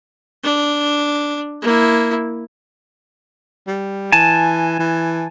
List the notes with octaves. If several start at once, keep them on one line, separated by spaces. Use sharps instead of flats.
D4
A#3 E4
G3
E3 G#5 A5
E3